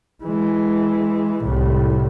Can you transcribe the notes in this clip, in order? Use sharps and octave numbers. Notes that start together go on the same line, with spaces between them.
E3 G#3
C2 A2